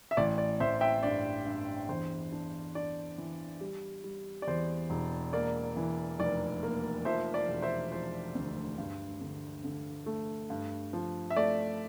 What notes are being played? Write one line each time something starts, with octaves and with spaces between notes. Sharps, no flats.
E5
A1 D5
D5
A1 C5 E5
E5 G5
G2 D5
G2
E2 C5
D4
D4 D5
E3
G3
G3
D5
E2 C5
E1
A#3 D5
E3
F1 D5
A#3
F3 C5 E5
D5
E1
C5 E5
F3 C5
D2
G2
D3
D3
A3
G2
F3
E5
A3 D5